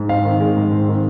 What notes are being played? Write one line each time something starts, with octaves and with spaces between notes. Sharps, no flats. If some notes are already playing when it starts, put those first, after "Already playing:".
Already playing: G#2
C4 F5
D#3
G#3
G#2
C4
D#3